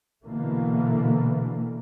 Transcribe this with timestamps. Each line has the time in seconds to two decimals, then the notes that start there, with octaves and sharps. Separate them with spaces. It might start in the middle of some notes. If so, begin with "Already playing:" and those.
0.24 B2 D3 E3 A3 A#3